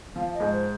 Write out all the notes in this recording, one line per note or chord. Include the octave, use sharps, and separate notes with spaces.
F3 F5
D#5
G#2
C5